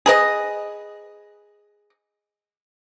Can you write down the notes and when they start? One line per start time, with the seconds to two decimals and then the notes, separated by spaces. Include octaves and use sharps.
0.06 G#4 B4 D#5